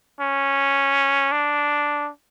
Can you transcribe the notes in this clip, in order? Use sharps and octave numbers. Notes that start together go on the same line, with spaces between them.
C#4
D4